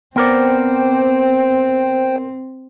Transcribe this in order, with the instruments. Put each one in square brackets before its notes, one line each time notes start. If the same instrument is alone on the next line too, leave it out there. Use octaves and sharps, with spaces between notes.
[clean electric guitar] B3 A#4 D5 [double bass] C4 [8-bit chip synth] C5 G5